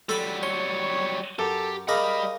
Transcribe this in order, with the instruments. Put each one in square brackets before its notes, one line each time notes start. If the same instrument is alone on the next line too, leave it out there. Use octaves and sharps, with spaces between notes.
[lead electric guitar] F#3 G3 [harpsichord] A4 B5
[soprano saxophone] C#5 [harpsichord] C6
[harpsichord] F#2 [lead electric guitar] G4 [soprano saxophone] A4
[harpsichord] C#3 A#4 D6 [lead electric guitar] G3 B5 [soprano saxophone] D#5